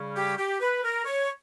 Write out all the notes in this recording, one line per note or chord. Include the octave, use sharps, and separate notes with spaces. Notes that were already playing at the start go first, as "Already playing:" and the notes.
Already playing: C#3 G3 C#4
G4
G4
B4
A#4
C#5